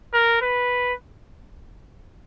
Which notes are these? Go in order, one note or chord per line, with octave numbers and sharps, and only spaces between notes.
A#4
B4